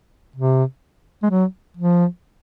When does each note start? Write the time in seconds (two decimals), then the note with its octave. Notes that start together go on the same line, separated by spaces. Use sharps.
0.36 C3
1.23 G#3
1.30 F#3
1.77 F3